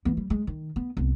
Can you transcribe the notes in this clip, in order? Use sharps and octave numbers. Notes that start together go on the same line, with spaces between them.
E3 B3
G3
G#3
D#3
B3
C2 B3